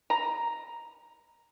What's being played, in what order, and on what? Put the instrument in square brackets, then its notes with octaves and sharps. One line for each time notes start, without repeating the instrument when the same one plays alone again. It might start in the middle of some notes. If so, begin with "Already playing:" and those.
[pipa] A#5